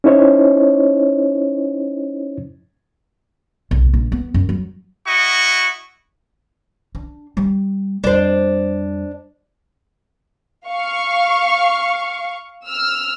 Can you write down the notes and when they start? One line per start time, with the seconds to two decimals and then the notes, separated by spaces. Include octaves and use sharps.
0.04 C#4 D#4 E4 C5 C#5 D#5
3.71 B1
3.94 A#1
4.12 B3
4.34 F#2
4.49 F#3
5.06 E4 F#4 D#5 C#6
6.95 D4
7.37 G3
8.04 F2 G3 D4 C5
10.66 F5 C#6
12.67 E6 F6